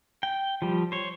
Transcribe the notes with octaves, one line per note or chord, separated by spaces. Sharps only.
G5
F3 G3
C5 C#5